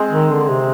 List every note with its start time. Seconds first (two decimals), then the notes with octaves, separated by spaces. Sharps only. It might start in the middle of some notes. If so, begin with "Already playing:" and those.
Already playing: G#3 C4
0.12 D#3
0.31 D3
0.50 C3